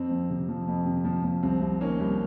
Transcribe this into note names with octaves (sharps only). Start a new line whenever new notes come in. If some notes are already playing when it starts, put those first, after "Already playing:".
Already playing: F2 C4
F3
C3
F3
F2
C3
F3
F3
C2 C4
C2
D#3 A#3 C#4
C2